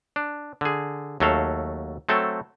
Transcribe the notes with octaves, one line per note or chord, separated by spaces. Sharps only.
D4
D3 G#4
D#2 F#3 A3 A4 F5
F#3 A3 C4 A4